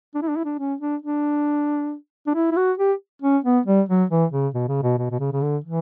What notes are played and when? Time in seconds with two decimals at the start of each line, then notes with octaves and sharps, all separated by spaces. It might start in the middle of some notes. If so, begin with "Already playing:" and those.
0.15 D4
0.22 E4
0.29 D4
0.37 E4
0.45 D4
0.59 C#4
0.81 D4
1.02 D4
2.27 D4
2.35 E4
2.52 E4
2.57 F#4
2.78 G4
3.22 C#4
3.44 B3
3.66 G3
3.89 F#3
4.10 E3
4.32 C#3
4.54 B2
4.68 C#3
4.83 B2
4.98 B2
5.11 B2
5.19 C#3
5.33 C#3
5.42 D3
5.64 E3